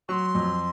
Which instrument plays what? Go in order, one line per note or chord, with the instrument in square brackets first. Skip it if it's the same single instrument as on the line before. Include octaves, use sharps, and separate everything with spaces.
[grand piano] F#3 [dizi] C6 C#6
[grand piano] F2